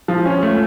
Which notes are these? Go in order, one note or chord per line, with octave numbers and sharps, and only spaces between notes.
F3
C#4
A3